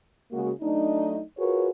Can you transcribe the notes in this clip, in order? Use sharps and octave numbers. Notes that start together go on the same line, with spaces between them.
C#3 G#3 A#3 F#4
F#3 A3 D4 D#4
F4 F#4 G#4 A#4 B4 C#5